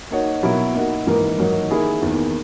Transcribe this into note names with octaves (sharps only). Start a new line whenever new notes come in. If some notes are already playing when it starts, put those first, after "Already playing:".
A#3 D#4 F#4 C#5
B2 F#3 A#3 E4 A#4
A#3 D#4 F#4
G#2 E3 A#3 D#4 A#4
G#2 D#3 F#3 A#3 D#4
D#3 A#3 E4 G#4
E2 D#3 A#3